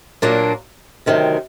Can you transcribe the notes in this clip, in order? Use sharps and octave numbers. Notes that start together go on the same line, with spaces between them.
A#2 F#3 A#3 D4
D2 C3 D#3 F#3